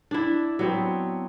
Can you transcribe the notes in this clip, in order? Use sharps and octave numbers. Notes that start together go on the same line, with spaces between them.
D4 E4
F#3 B3 C4